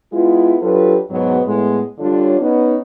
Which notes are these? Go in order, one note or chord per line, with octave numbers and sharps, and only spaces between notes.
G#3 B3 E4 F4
F#3 D4 F4 G4 A4 B4
G#2 B2 F#3 B3
A2 G#3 B3
D3 G3 D4 F4 C#5
B3 C#4 D#4